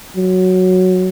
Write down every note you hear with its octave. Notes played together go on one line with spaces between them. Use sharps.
F#3